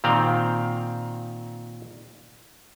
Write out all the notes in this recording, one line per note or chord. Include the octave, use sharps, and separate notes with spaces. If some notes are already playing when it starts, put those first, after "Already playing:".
A#2 D#3 C4 F5